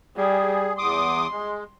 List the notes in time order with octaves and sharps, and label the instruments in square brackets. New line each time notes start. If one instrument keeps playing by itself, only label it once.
[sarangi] G3 [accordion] G#4
[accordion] E2 D6 D#6 [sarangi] C6
[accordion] G#3